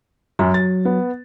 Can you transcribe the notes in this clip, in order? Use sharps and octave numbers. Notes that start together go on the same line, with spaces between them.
F#2 F#3
A6
B3